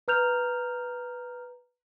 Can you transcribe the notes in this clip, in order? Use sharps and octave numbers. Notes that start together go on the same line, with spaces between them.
B4 A#5 F6 G6 F7